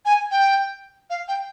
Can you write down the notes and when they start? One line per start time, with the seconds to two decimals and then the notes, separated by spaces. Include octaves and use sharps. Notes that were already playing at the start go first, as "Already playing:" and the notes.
0.05 G#5
0.31 G5
1.10 F5
1.28 G5